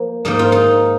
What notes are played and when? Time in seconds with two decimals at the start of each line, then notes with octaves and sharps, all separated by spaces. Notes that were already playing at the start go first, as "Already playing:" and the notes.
Already playing: F3 A#3
0.25 G#2 F3 A#3 D#4
0.39 F4
0.52 D#4